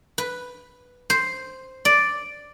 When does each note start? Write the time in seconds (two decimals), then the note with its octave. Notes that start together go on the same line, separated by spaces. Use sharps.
0.18 B4
1.10 C5
1.85 D5